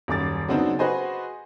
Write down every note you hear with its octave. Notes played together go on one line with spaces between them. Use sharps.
D#1 F#2 D6 A6
C#3 F#3 B3 C4 D4 D#4
F#4 G#4 B4 C5 D#5 G#5